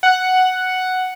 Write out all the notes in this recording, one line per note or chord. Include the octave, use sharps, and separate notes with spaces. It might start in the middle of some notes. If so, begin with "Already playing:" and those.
F#5